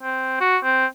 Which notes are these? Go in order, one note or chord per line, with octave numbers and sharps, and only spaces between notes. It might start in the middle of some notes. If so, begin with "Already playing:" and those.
C4
F#4
C4